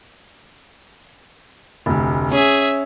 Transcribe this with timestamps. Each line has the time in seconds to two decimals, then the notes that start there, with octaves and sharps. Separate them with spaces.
1.86 F1 D2
2.32 C#4 G#4 E5